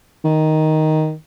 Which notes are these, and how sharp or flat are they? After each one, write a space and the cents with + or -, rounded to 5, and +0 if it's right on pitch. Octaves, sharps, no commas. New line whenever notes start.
D#3 +5